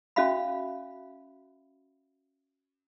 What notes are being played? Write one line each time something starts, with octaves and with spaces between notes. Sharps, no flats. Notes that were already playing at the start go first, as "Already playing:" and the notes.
C#4 F#4 E5 F5 B5